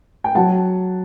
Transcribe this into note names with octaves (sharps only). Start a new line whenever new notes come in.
G5
F#3 F#5 A5